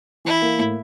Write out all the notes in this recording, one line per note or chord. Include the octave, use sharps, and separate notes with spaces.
E3 E4
A#3
A2